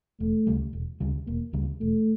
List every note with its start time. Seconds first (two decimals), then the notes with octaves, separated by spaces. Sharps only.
0.20 E1 A3
0.47 D2 C#3 G3
0.73 E1
1.00 D2 C#3 G3
1.27 E1 A#3
1.53 D2 C#3 G3
1.81 E1 A3